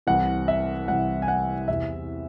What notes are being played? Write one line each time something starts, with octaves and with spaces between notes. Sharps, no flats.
C2 C3 E3 F#5
E5
C2 C3 E3 F#5
G#5
F#5
E2 C3 E3 E5